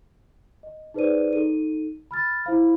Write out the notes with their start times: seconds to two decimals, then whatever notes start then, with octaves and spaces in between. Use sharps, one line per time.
0.63 D#5
0.94 D#4 G#4 B4 C5 D5 D#7
1.33 D#4 A4 D#7
2.11 B5 F6 A6
2.45 E4 C5 F5 B5